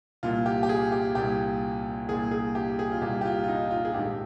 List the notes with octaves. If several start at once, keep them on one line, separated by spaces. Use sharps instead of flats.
C2 A#2 F4
G4
G4
G#4
G4
C2 A#2 G4
C2 A#2 G#4
G#4
G4
G#4
F4
C2 A#2 G4
G4
F4
F4
D#4
F4
G#4
A#1 G#2 D#3 G4